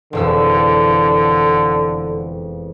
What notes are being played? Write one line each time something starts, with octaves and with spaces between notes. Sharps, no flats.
E1 F2 D3 E6